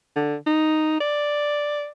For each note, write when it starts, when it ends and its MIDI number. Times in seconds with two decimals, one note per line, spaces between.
0.16 0.36 50
0.46 0.98 63
1.00 1.88 74